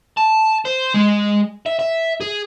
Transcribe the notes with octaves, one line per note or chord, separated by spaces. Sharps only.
A5
C5
G#3
E5
E5
G#4